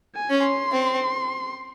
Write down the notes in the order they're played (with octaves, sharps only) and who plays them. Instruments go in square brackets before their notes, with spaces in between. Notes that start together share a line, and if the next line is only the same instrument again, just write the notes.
[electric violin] G#5
[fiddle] C#4
[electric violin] C6
[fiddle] C4